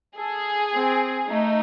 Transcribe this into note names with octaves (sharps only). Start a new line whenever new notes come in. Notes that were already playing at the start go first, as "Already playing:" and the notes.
G#4 A4
C4
A3 D#4